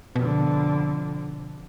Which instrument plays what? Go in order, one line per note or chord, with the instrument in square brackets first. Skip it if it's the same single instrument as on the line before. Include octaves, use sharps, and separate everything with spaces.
[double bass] F2 D3 [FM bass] B2